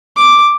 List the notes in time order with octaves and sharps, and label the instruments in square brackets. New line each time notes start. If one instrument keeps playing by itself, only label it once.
[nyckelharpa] D6